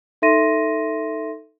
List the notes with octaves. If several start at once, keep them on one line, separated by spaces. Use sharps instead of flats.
D#4 A4 E5 C6 A#6 D#7